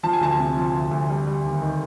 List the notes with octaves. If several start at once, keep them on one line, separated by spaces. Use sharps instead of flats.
F3 A5
G#5
D2 A5
C3
F3
D2
D2
G3
G3
D#2
D#3